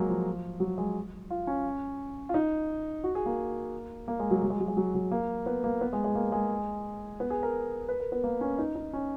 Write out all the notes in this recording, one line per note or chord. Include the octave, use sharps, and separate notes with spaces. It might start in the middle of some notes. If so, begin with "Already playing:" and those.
Already playing: F#3 G#3 A#3
F3
F#3
G#3
F4
C#4
F4
D#4
F#4
G#4
A#3
A#3
G#3
F#3
F#3
G#3
F#3
G#3
F#3
F#3
A#3
B3
A#3
B3
G#3
G#3
A#3
G#3
B3
G#4
A#4
B4
A#4
B3
A#3
C#4
D#4
D#4
C#4